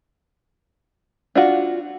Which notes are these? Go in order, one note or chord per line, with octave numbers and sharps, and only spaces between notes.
D4 F4 F#4